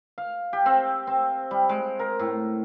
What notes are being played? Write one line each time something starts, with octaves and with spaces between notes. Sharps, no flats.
F5
G4
C4
C4
G3
G#3
A#4
A2